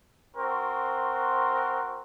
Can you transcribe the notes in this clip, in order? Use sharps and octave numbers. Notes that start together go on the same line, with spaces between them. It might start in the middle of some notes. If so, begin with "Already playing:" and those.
C4 F#4 A#4 C6 C#6